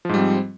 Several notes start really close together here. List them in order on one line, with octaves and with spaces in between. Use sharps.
F3 G#2 G3 C4